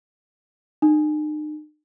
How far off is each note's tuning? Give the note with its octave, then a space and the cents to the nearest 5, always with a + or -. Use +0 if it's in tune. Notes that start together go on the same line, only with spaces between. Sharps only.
D#4 -40